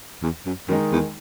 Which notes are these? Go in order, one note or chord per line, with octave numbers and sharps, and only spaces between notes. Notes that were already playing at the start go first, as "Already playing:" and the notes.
E2
F#2
F#2 D#3 G#3 D#4
E2